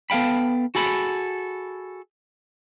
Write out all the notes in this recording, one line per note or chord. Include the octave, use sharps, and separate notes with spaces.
B3 A4 F5 G5 B5
F#4 G#4 A4 B5